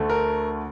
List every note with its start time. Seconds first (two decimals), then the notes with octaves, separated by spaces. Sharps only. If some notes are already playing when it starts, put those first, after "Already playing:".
Already playing: D2 D3 A3
0.10 A#4